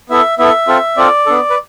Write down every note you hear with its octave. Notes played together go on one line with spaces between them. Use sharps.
B3 E4 A4 E5
B3 E4 A4 E5
C4 F4 A4
C4 F4 A4 D5
B3 D4 A4
B4